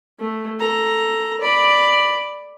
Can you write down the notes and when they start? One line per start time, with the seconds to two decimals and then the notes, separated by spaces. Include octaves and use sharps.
0.20 A3
0.60 A4 A#5
1.41 D5 B5